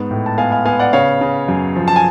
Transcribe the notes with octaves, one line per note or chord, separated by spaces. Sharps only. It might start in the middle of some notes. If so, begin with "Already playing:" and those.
Already playing: G#2 B3
A2
A5
B3 F5 G#5
F5 G#5
B3 F5 G#5
D5 F#5
C#3 C#5 F5
C#3
F#2
F3
A5
G#5